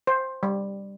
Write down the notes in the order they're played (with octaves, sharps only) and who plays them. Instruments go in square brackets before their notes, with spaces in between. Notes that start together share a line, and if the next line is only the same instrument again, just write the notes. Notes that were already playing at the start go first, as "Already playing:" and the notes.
[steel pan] C5
G3